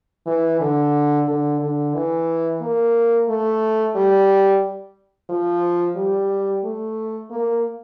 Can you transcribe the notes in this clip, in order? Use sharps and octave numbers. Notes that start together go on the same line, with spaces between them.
E3
D3
D3
D3
E3
A#3
A3
G3
F3
G3
A3
A#3